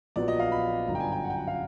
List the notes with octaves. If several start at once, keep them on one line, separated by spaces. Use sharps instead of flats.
A#1 A#2 F#3 B3 D5
D#5
F5
B5
G1 F#2 D3 A#5
G5
G#5
G5
F#5
G5
F#5
F5